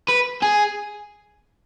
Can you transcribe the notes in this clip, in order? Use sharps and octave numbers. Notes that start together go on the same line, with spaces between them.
B4
G#4